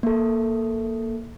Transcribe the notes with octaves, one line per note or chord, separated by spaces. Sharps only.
A#3 A4